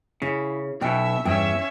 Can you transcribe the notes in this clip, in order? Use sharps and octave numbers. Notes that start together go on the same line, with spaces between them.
C#3 E4
B1 B2 C#4 E5 G5
E2 G2 C#4 E5 G5 A5